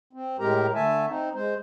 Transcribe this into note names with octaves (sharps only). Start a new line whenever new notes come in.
C4
A2 G#3 G4 A#4 A#5
D3 A3 E5 G#5 A5
C4 D#4
G#3 C5